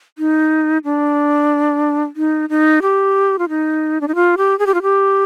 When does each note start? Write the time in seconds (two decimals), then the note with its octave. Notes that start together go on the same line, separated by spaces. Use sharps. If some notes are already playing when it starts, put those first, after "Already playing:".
0.18 D#4
0.84 D4
2.16 D#4
2.50 D#4
2.82 G4
3.39 F4
3.49 D#4
4.01 D4
4.08 D#4
4.15 F4
4.38 G4
4.59 G#4
4.66 G4
4.74 F4
4.82 G4